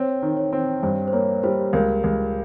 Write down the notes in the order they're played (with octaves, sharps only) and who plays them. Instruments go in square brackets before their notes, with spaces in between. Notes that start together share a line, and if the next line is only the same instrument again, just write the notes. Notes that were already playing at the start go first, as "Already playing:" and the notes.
Already playing: [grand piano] C4 [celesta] C#5
[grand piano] D#3
[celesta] C#5
[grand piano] C4
[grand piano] G2 [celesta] C5
[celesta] C5
[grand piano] A#3 [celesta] C#5
[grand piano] G3 [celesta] C5
[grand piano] C#2 [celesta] A#4
[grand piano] C#2